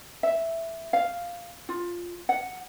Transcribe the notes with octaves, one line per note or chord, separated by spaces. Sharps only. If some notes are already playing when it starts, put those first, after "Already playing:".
E5
F5
F4
F#5